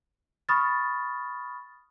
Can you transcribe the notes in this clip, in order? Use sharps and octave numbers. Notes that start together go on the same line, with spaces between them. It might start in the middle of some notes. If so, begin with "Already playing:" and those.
B5 C#6 D#6 F6 A6